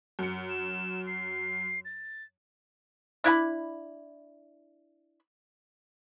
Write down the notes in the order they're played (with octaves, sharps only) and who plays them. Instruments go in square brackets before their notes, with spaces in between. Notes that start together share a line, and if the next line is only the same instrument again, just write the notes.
[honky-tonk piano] F#2 C#7
[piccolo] E7
C7
A6
[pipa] D4 E4 F5 B5